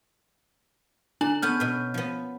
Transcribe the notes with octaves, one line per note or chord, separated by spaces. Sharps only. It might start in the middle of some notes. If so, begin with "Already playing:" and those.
D3 D4 G#5 F#7
B3 C#4 A4 F6 G6
B2 B4
F3 B3